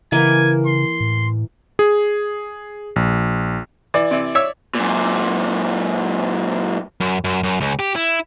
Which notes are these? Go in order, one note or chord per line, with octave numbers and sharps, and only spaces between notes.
C#3 E3 A#3 G#5
C6
A2
G#4
A#1
E3 D5
C3 E3
C#5 E5 E6
F#2 A#2
F#2
F#2
F#2
C#2
G4
E4